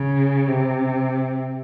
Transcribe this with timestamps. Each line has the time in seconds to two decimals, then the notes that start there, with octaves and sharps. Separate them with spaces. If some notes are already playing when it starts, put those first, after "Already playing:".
Already playing: C#3
0.48 C3